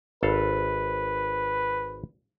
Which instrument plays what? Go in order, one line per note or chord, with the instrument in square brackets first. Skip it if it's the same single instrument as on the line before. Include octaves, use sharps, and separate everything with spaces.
[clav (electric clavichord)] G#1 A4 F5 [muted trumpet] B4